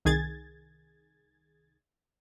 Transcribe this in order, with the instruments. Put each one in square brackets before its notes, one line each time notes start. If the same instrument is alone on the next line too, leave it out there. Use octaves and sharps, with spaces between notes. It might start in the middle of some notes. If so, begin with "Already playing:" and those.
[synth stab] C2 D#3 G#4 G#6 A6